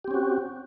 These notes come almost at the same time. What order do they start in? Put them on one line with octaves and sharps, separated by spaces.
G4 C4 C#4 F#4